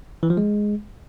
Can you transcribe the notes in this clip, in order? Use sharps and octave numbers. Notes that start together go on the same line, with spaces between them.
E3
F3
G#3